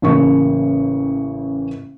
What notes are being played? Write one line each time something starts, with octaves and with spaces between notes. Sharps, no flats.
A1 C#3 A#3 C#6